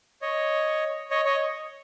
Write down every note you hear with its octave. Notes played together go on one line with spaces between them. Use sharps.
C#5 D#5
C#5 D#5
C#5 D#5